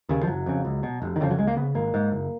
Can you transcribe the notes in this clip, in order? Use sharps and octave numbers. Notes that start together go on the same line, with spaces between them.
D#2 C#3
F3
F#1 F#3
F2 C#3
C#2
B2
F1
D#3
F2 C#3 F3
F#3
C#2 G#3
A#3
C#3 B3
G#1 A#3
G#2
F#1